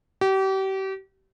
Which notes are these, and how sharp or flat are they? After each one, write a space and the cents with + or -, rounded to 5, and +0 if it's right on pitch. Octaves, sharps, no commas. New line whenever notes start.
G4 -35